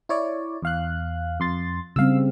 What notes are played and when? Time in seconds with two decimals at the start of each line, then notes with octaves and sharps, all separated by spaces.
0.09 E4 C#5 D5
0.62 E2 F5 F#6
1.40 F2 C6 A6
1.96 C#3 G3 C4 F5 E6